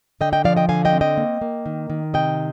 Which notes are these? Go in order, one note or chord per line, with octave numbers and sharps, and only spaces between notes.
D3 D#5 G5
D#5 G5
F3 D5 F5
D#5 G5
D3 F5 G#5
D#5 G5
C4
D#5 G5
A#3
A#3
D#3
D#3
C3 D#5 G5